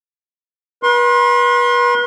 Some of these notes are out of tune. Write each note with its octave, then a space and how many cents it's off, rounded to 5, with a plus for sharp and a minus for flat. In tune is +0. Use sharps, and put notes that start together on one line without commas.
B4 -35 C6 +30